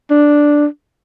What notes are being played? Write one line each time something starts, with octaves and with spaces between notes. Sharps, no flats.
D4